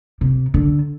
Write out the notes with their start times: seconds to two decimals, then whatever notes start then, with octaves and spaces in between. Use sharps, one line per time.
0.21 C3
0.54 D3